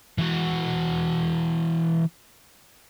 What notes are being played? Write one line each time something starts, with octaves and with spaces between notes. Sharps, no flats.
E3 F#4